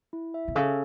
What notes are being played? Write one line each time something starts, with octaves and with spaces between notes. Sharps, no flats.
E4
E5
B2
C#3 A4